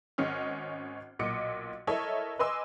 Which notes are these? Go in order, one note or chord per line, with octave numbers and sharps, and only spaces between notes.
G#1 C#4 D#5 F6
B1 A#2 D#5 D6 C#7
E4 A4 A#4 C#5 D#5 E5
B4 D#5 G#5 C6 D6 E6